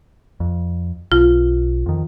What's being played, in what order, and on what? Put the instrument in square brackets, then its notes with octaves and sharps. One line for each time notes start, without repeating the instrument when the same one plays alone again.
[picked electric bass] F2
[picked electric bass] B1 [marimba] F4
[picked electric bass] F2 D#3